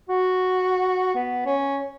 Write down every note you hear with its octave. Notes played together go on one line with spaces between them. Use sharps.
F#4
B3
C#4